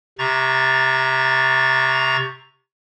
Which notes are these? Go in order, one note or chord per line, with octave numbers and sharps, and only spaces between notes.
C3 A#5 C#6 A6